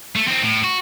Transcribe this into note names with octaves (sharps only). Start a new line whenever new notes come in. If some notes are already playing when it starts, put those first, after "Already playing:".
A3
C4 D#4
A2
F#4